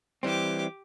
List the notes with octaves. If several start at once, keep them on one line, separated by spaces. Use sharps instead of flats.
E3 G3 C4 G4 D6